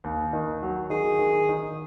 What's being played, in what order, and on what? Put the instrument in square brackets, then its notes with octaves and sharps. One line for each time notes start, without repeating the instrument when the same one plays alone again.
[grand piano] D#2
D#3
F#3
[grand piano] D#3 [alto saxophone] G#4
[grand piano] D#3
D#3